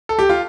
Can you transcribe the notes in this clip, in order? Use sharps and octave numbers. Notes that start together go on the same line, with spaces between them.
A4
G4
F4